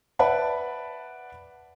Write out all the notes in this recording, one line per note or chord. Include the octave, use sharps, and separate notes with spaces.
B4 D5 E5 F#5 A5 B5